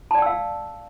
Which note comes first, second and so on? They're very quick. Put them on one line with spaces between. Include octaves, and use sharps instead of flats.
A5 D5 G5 E6 F5